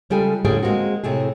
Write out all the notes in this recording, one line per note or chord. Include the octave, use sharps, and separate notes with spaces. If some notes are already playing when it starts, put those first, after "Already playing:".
C#3 G3 G#3 F4 A4 G#5
A2 D3 G3 A#3 C#4 G#4
G#3 A#3 C4 F#4
A2 C3 A3 G#4